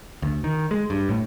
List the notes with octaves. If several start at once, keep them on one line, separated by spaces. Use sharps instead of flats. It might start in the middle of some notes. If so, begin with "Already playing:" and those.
D2
D#3
G#3
G2
A2